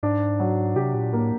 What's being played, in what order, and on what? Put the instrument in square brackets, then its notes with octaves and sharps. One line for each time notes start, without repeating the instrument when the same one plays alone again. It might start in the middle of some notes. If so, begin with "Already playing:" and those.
[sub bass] G#2 [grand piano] D4
[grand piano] F#3
[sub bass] C3 [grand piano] G4
[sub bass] A#2
[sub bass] A2 [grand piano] A#3